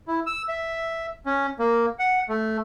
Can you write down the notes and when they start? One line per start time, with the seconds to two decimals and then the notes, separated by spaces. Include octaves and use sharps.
0.08 E4
0.26 E6
0.48 E5
1.26 C#4
1.59 A#3
1.99 F#5
2.29 A3